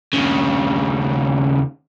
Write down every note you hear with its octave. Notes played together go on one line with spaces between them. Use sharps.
D#2 C#3